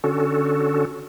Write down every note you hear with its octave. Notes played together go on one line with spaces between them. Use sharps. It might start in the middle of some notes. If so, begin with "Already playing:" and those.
D3 C#4 F#4 A4